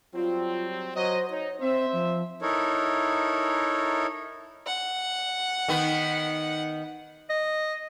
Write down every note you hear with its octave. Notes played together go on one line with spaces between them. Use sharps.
F#3 G3 C4 F4
F#3 C5 D#5
D#4 C#5
C4 C5 E5
F3
D#4 E4 A4 A#4 C#5
F#5
D#3 B3
D#5